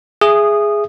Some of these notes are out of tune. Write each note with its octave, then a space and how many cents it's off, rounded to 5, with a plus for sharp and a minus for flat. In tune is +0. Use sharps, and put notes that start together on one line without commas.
G#4 +0 E5 +20 D#6 -15